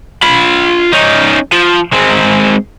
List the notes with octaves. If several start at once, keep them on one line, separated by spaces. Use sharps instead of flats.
F4 B5
C#4 D#4
F3
G#3 C4